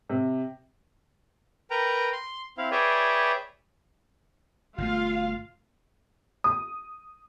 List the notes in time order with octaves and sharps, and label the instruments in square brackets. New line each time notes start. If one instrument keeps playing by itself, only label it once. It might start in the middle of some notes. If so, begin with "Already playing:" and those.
[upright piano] C3
[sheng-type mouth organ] A#4 B4 G5 A#5
C6
C4 E4 F5
G#4 B4 C#5 D5 E5 G5
[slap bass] G1 B2 A3 [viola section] F4 F5
[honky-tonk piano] D#6